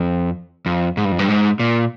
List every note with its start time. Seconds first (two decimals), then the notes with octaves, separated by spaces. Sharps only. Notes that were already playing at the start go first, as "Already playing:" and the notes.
Already playing: F2
0.66 F2
0.97 G#2
1.05 G2
1.12 F2
1.19 G2
1.29 G#2
1.60 A#2